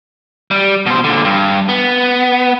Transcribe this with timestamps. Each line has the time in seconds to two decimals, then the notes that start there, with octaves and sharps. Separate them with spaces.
0.51 G3
0.86 B2 C5
1.04 A#2 D3
1.24 G2
1.69 B3